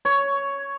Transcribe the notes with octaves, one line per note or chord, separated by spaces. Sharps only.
C#5